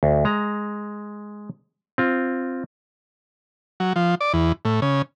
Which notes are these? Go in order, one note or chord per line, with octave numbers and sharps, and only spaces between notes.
D2
G#3 A#5
C4 F4
F#3
F3
D5
E2
A2
C#3